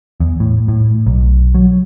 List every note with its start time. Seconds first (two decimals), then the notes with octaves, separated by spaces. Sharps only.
0.20 E2
0.40 A2
0.68 A2
1.07 B1
1.55 F#3